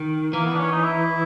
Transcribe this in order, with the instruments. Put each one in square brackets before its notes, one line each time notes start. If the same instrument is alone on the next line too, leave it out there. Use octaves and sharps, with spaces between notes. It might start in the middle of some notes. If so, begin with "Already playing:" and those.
Already playing: [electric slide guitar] D#3
[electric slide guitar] E3 [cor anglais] A#3
[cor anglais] B3
D4
C#4
D#4
E4